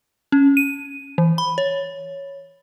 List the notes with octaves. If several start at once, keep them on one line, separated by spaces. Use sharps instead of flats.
C#4
D#7
E3
B5
C#5